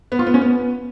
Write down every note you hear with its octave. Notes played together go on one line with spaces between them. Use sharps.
B3
F4
B3
C#4
B3